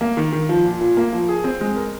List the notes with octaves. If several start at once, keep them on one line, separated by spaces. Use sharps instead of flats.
A#3
D#3
D#3
F3
A#2
A#2
A#3
F3
G#4
C4
G#3
A#4